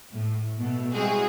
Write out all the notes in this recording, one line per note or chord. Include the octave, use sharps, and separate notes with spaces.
A2
B2 A3
G3 G#3 C4 E4 F#4 G#4